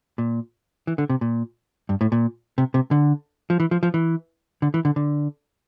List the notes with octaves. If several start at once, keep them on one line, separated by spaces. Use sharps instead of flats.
A#2
E3
D3
C3
A#2
G2
A2
A#2
C3
C3
D3
F3
E3
F3
F3
E3
D3
E3
D3
D3